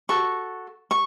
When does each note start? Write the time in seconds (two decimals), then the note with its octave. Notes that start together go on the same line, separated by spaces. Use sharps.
0.09 F#4 A4 C#6
0.91 C#6